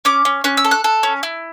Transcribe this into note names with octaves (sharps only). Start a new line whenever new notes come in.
C#4 D6
C#4
C#4 F#6
E6
A4
F#6
A4
C#4
E4